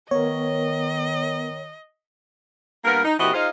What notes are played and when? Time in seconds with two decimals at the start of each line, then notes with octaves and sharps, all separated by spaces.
0.11 D#3 B3 A#4 C#5 D#5
2.85 G2 A#3 B3 A#4
3.04 D#4
3.20 A#2 E3 C4 F#4 G4 D#5
3.34 D#4 F4 G#4 C5 D#5 F5